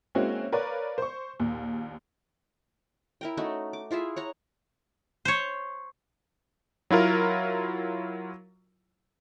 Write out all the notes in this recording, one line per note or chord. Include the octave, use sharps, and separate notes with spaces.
G#3 A#3 C4 C#4 E4 F#4
A#4 B4 C#5 D5 F5
C5 C#6
A#1 D#2
E4 A#4 G5
A3 C#4 D#4 F#4
D6
E4 F4 G#4 E5
C#5 F#5 A#5
C5 C#5
F#3 E4 F4 A#4